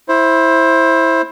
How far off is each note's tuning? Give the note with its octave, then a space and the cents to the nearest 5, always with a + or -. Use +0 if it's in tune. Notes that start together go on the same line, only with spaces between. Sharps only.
E4 +0 C5 +20